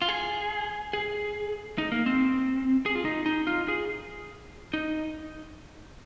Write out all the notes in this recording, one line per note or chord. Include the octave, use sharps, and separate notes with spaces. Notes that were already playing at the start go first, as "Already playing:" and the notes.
F4
G#4
G#4
D#4
A#3
C4
G#4
F4
D#4
D#4
F4
G#4
D#4